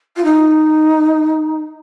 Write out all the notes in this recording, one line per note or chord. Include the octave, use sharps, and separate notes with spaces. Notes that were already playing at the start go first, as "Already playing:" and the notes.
F4
D#4